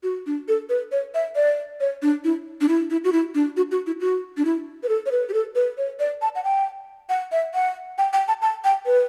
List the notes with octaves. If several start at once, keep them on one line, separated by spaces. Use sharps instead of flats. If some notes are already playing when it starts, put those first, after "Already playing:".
F#4
D4
A4
B4
C#5
E5
D5
C#5
D4
E4
D4
E4
E4
F#4
E4
D4
F#4
F#4
E4
F#4
D4
E4
B4
A4
C#5
B4
G4
A4
B4
C#5
D5
A5
F#5
G5
F#5
E5
F#5
G5
G5
A5
A5
G5
B4